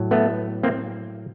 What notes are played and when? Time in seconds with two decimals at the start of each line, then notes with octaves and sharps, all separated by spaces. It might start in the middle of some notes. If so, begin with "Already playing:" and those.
Already playing: A2 F#3
0.11 A3 B3
0.63 A#3 C4